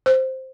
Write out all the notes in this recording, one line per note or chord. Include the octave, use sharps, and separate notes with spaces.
C5